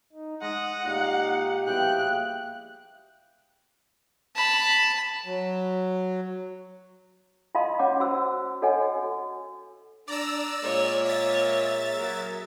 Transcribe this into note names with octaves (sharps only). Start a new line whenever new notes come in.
D#4
G#3 F#5 D#6 A#6
A#2 D#4 G4
B2 F3 G3 E4 G#4 G5 F#6
A5 B5
F#3
F4 D#5 F5 A5 C6 D#6
C#4 C#5 F#5 C6 D6
F#4 C5 E6
F#4 A4 C#5 D#5 F#5 G#5
F#4
D4 D5 A#5 E6
A#2 G#3 A#3 C#5
E5 A6
F#3 G#4 A#4